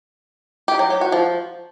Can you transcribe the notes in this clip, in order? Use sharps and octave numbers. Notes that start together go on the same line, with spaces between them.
G4
F#3
G4
F#4
F3